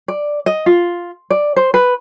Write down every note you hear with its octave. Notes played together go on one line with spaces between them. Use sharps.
D5
D#5
F4
D5
C5
B4